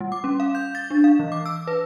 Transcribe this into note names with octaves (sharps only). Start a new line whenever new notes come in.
G3
D6
C#4
F5
G6
A6
D4
F5
E3
D6
E6
B4